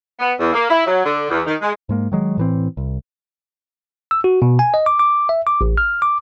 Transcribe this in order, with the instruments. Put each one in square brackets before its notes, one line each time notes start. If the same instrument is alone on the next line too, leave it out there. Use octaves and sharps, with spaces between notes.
[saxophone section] B3
E2
A#3
E4
F#3
D3
E2
D#3
G#3
[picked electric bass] G#2 G#3 A#3
D#3 F#3 G#3
A2 E3 C4
C2
[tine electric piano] E6
F#4
B2
G#5
D#5
D6
D6
E5
D6
A1
F6
D6